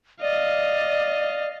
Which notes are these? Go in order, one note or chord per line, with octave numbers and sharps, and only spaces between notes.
D5 D#5 F5